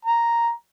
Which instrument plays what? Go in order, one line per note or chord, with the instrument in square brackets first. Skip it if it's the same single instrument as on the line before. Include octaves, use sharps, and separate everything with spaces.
[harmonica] A#5